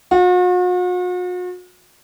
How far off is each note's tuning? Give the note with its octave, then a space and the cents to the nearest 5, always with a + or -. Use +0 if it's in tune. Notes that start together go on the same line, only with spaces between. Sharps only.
F#4 -45